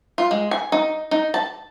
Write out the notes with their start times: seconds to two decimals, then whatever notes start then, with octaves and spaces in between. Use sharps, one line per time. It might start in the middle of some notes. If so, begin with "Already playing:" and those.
0.18 F4
0.31 G#3
0.51 G#5
0.72 D#4
1.11 D#4
1.34 A5